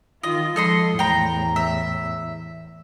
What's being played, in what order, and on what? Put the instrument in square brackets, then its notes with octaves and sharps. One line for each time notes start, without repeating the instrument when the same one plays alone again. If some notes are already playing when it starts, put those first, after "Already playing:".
[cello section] D#3 F4 [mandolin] D#5
[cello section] F3 G#3 [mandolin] A4 D#5 C6
[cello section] E2 A2 [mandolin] G5 A#5
[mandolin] E5